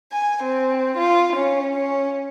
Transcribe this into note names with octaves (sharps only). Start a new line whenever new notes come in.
G#5
C4
F4
C#4
C#4